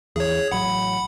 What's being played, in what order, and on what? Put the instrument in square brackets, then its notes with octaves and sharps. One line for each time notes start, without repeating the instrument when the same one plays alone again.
[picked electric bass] E2 E3 [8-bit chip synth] G#4 C#5
[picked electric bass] A1 F#3 [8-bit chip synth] F#5 B5